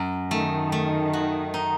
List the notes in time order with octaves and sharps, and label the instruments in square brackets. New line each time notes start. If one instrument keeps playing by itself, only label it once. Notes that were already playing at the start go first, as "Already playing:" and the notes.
Already playing: [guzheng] F#2
[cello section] D#3 [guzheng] A3
[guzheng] A3
F#4
D#4